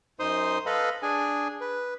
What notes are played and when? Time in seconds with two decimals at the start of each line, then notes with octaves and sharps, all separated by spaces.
0.20 F#2 D#4 C5 C6 D#6
0.66 A4 B4 D#5 F5 B5
1.03 D4 G#4 G#5
1.61 B4